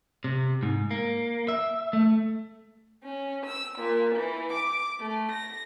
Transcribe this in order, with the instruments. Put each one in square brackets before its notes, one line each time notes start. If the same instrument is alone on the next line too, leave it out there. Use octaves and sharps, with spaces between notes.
[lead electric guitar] C3
G#2
A#3
E5
A3
[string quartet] C#4
E6
A#2
E3
D6
A3
A#6